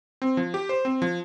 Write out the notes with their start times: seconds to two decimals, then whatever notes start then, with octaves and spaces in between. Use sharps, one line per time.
0.22 C4
0.37 F3
0.54 G4
0.69 C5
0.85 C4
1.02 F3